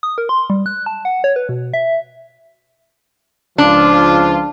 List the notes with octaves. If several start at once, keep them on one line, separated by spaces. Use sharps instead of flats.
D#6
A#4
C6
G3
F#6
A5
F#5
C#5
B4
B2
E5
C#2 F3 D4 F4